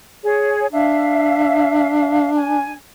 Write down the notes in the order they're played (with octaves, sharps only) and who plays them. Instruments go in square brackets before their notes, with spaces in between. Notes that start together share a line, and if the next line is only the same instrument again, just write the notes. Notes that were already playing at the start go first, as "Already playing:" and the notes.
[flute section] G#4 C#5
[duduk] D4 [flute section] E5 F5
[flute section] G#5